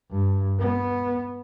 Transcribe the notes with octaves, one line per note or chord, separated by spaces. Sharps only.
G2
B3